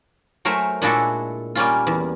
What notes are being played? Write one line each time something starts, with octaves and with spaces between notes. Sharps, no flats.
F#3 A3 A#4 C5 E5 G#5
A#2 G#3 D4 E4 F#4 A4
G3 A#3 C#4 F4
E2